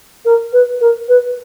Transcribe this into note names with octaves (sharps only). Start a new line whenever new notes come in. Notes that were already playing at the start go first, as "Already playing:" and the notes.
A#4
B4
A#4
B4